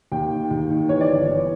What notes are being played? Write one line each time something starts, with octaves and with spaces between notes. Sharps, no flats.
D#2 G5
D#3
D#2
D#3
E3 C#5
D5
G1 C#5
E3